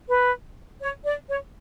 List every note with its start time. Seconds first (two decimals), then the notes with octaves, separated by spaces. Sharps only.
0.09 B4
0.80 C#5
1.05 D5
1.28 C#5